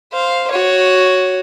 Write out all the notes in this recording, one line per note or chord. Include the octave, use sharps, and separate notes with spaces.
C5 F5
F#4 C#5